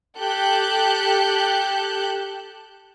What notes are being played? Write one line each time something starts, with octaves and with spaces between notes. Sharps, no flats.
G4 A4 F#6 G6